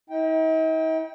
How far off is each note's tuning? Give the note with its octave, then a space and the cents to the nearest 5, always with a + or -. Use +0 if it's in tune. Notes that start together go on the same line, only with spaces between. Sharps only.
D#4 +45 G5 +0